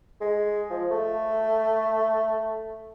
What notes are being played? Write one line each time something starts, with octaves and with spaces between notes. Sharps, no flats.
G#3
F3
A3